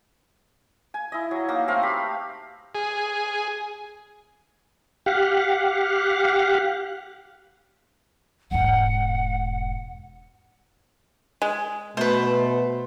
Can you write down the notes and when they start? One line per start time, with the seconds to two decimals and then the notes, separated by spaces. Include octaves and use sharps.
0.94 G#5
1.12 E4 D#5
1.31 F#3
1.48 A#3 D#4 A#5
1.68 A3 C4 A#4 F5
1.83 G4 B5
2.75 G#4
5.06 G4 F5 F#5
8.51 E1 G#2 F#5
11.42 G#3
11.97 B2 A3 B4 C5